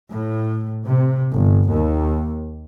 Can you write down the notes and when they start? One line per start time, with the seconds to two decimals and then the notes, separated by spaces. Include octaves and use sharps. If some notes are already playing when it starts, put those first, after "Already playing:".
0.10 A2
0.84 C3
1.32 G1
1.70 D#2